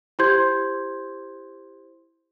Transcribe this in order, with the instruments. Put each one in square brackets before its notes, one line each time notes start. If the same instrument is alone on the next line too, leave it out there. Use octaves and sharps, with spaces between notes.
[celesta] E4 G4 C5 C6 G6 G#6